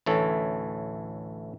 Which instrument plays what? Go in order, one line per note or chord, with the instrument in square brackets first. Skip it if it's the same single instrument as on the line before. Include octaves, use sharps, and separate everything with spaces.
[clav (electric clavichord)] A1 D2 A2 E3 A4 C#5